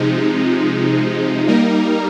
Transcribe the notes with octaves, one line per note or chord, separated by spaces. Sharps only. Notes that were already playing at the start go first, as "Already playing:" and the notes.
Already playing: C3 F3 G#3 D#4
G3 A#3 D#4 A#4